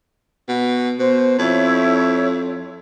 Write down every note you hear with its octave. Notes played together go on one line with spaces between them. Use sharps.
B2
B2 C5
F2 E4 C#5